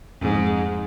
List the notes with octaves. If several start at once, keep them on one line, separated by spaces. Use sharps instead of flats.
F2 G#2 F3 C4 D#4 G#4